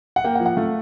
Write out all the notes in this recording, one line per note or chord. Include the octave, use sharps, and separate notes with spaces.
F#5
A#3 G5
F#5
F3
F#5
A3 F5